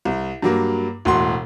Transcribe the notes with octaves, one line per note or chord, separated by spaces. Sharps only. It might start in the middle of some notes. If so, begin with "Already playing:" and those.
C2
G2 F#3 A#3
E1 A2 F#4 C6